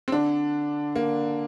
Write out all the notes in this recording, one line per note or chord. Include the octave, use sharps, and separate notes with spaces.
C4
D3 D4
A#3